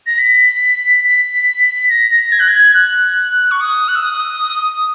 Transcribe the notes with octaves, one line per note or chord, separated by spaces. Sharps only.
A#6
B6
B6
A#6
A#6
G#6
F#6
G#6
F#6
C#6
D#6
F#6
E6
D#6